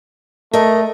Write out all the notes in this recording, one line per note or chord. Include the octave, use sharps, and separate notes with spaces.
A3 A#4 D#5